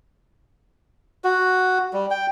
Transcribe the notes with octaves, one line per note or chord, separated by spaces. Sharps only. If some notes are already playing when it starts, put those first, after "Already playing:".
F#4
G3
G5